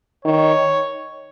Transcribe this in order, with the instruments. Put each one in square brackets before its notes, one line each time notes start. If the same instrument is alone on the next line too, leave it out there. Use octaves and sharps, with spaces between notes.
[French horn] D#3 [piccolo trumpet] C#5